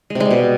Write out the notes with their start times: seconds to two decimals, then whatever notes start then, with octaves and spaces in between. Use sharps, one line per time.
0.10 G#3
0.15 C3
0.20 G#3
0.25 G3
0.30 B2